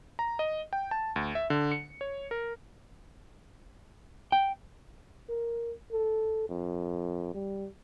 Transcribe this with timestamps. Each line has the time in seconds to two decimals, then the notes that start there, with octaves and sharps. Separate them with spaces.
0.19 A#5
0.39 D#5
0.73 G5
0.91 A5
1.16 D2
1.35 E5
1.50 D3
1.72 C#7
2.01 C#5
2.31 A#4
4.32 G5
5.29 A#4
5.92 A4
6.49 F2
7.34 G3